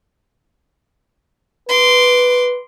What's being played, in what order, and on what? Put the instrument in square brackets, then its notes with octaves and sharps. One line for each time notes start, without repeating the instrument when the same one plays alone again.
[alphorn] B4 [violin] C6 D6